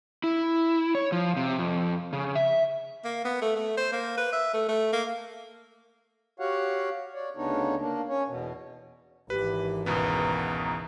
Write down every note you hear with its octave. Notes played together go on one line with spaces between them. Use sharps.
E4
C#5
F3
C3
F2
C#3
E5
A#3
B3
A3
A3
C5
A#3
B4
E5
A3
A3
A#3
F#4 G4 C#5 F5 F#5
C#5 D5
D2 C#3 B3 D4 D#4 C#5
A#3 D4
C#4 C#5
E2 B2
G#1 E3 G4 B4
C#2 B2 B3 A#5